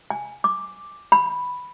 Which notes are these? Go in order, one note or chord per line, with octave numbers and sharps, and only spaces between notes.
G#5
D6
B5